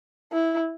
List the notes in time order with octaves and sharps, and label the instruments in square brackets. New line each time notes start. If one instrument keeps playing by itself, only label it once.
[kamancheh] E4